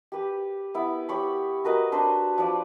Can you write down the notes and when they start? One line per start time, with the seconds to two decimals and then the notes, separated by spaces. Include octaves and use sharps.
0.12 G4 B4
0.74 B3 E4
1.09 G4 C#5 B5
1.64 F#4 A#4 B4 D#5
1.92 D4 B4 C5
2.38 F3 D5